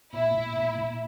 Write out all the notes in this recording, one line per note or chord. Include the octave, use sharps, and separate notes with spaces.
A#2 E4
A#2
A#2
A#2